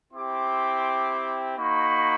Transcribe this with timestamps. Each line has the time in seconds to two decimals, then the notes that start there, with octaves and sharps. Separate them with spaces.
0.13 C4 E4 G4 C6 D6
1.57 A#3 D#4 F#4 B5 C#6